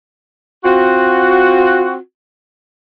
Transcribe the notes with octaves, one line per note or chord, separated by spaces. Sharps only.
C4 F4 F#4